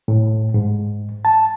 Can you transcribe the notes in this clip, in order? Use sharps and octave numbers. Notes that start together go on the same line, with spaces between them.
A2
G#2
A5